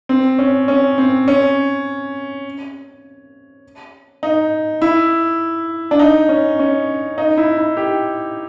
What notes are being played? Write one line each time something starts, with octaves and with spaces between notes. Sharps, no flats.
C4
C#4
C#4
C4
C#4
D#4
E4
D4
D#4
C#4
C#4
D#4
E4
E4
G4